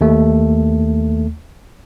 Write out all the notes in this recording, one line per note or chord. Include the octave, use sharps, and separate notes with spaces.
D#2 A3